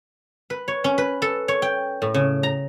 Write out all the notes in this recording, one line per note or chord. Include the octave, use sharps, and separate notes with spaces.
B4
C#5
C#4
B4
A4
C#5
G5
A2
C#3
A#5